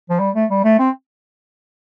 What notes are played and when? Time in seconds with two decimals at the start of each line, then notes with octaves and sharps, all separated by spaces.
0.10 F3
0.20 G3
0.35 A3
0.50 G3
0.64 A3
0.79 C4